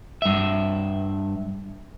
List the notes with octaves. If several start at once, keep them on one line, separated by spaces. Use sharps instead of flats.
G2 E5